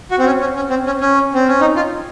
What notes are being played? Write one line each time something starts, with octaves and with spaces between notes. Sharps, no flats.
F#4
C4
C#4
C#4
C#4
C4
C#4
C#4
C4
C#4
D#4
F4